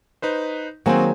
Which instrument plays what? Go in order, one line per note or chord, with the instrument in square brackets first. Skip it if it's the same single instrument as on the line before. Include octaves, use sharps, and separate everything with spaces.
[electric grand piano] D#4 B4 C5
[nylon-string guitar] D#3 F#3 A#3 [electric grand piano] C4 F#4 [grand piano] G#4 C5 G#5